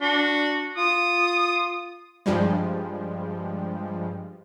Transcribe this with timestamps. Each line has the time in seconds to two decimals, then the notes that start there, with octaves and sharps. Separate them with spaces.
0.01 D4 F#4
0.77 F4 D#6
2.26 G2 F3 G3 G#3